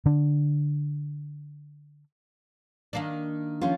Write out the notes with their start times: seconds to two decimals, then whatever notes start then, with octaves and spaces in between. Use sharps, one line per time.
0.06 D3 D4
2.93 D#3 A#3 D4
3.61 F3 C#4 F4